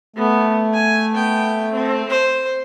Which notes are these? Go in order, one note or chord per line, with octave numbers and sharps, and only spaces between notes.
A3 B3
G#5
B3 G5
C4
C5